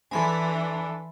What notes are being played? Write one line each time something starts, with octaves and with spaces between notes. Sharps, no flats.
E3 D4 A4 G#5 B5 C6